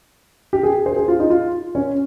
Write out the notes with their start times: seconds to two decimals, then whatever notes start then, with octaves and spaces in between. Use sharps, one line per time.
0.53 G4
0.63 G#4
0.86 C5
0.96 G#4
1.08 F4
1.20 D#4
1.30 F4
1.75 C#4